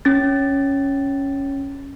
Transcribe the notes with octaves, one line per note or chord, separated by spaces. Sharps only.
C#4 A6